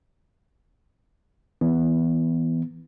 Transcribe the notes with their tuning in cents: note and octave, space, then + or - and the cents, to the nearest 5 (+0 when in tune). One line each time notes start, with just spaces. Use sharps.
E3 -15 B3 +0